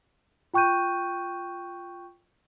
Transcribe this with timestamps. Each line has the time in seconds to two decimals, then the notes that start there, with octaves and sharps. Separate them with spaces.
0.54 F4 G5 C#6 F#6 G6 D#7